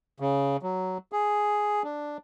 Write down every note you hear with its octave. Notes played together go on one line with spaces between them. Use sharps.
C#3
F#3
G#4
D4